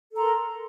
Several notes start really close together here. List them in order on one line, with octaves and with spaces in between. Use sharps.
A4 A#5 C6 A#4